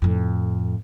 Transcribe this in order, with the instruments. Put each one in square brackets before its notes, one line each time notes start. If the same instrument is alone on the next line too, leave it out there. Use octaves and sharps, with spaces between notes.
[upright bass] F2 A2